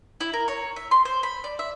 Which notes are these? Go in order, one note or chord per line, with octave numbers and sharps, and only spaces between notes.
E4
A#4
C#5
E5
C6
C5
B5
D5
E5